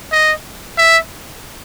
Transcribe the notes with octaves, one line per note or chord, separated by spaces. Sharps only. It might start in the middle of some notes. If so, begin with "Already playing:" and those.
D#5
E5